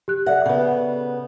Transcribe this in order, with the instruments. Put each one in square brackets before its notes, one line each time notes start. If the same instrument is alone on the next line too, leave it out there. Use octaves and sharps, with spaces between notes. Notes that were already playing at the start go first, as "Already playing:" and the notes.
[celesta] G4 F#6
[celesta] A4 D5 E5 [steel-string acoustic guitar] F#5
[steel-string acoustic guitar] C#3 B3